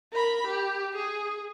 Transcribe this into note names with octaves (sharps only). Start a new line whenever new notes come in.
A#4 B5
G4
G#4